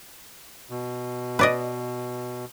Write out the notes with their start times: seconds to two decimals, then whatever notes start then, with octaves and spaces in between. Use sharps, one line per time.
0.70 B2
1.39 B4 D5 D#5